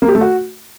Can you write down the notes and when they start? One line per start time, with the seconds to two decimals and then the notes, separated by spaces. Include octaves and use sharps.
0.02 A#3
0.08 G4
0.15 A3
0.21 F#4